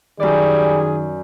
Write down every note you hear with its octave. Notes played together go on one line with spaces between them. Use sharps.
F#2 D#3 G3 G#4 D5